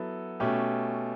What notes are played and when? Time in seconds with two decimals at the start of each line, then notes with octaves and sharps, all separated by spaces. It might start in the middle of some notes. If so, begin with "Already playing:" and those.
Already playing: F#3 B3 E4 A4
0.40 B2 A3 C#4 G4